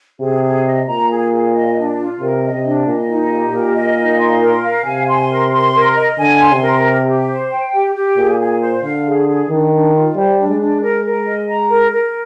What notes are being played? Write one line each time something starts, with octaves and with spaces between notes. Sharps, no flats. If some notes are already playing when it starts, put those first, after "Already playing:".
C3 G#4
G#4
D#5
A#2 A#5
G#4
G#4
D#5
D4
F4
C3 A#4
D#5
C3
D4
A#2 D#5
D#4
G4
A#2 A#4
D#5
D#4
C6
A#4
F5
C3 G#5
C6
A#4
C6
A#4
D#5
D3 G#5
C6
C3
A#4
G4
G4
C5
G5
G4
G4
A#2 G#4
G#4
C5
D3 F5
G#4
G#4
D#3 D4
D4
F4
G3 C5
D4
G#3
D4
A#4
A#4
D#5
A#5
A#4
A#4